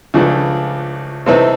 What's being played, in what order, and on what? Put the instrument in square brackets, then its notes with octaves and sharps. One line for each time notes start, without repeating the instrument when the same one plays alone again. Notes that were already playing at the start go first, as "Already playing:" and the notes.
[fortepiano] C#2 C#3 F3 A3 D4
C3 E3 A3 C4 D#4